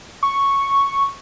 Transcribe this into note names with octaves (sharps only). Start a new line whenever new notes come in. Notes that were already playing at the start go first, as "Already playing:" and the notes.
C#6